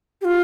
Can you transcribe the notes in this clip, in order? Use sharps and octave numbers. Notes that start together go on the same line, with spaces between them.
G4
F4